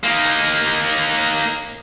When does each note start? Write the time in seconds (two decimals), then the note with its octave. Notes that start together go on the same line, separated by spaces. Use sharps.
0.03 A#3 D#4